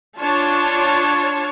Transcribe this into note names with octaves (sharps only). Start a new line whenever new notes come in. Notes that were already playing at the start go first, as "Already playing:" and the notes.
D4 F4 C#5 A5